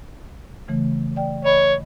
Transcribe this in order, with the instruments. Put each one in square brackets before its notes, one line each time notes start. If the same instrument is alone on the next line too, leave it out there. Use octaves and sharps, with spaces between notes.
[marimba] C#3 E3 A3
D5 G5
[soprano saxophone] C#5 [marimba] D#5 B5